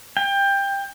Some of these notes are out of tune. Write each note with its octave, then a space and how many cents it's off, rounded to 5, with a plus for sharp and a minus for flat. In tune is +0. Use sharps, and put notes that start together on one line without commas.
G5 +20